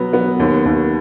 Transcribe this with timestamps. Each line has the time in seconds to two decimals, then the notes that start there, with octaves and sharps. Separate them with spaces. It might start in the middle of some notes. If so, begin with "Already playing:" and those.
Already playing: B2 F#3 B3
0.13 B3
0.40 D#2
0.66 D#2